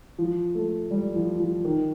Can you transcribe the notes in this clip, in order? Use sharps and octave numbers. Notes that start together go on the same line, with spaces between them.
F3
A3
G3
F3
F3
D#3